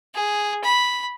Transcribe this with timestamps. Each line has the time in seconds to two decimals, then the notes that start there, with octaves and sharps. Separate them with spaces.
0.15 G#4
0.64 B5